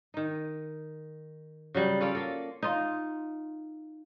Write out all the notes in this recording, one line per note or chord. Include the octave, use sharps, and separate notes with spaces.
D#3 D#4
C#3 F#3 G3
C#4 F4 A4 D5
A#3 A4
D#4 F4